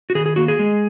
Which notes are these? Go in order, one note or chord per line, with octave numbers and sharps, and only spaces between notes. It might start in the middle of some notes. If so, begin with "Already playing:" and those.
F#4
D#3 G#4
G#4
A#3 F#4
G#4
G#3